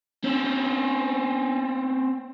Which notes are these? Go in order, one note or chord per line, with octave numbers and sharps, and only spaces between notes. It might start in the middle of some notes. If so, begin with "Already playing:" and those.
C4 C#4